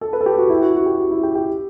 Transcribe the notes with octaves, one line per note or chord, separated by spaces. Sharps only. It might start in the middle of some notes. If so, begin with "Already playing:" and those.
A4
B4
A4
G4
F#4
E4
F#4
F#4
G4
F#4
E4
G4
G4